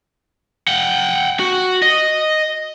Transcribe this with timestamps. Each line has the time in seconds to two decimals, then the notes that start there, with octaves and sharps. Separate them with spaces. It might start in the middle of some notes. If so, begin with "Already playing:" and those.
0.68 F#5 G5
1.39 F#4
1.82 D#5